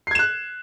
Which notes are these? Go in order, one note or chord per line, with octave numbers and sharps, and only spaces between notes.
F#6 G#6 C7 E7